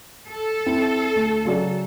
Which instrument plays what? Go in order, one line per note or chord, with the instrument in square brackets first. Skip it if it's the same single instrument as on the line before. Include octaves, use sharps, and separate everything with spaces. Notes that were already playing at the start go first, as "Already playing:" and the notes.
[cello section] A4
[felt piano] C4 E4
D2
C#3 F#3 D5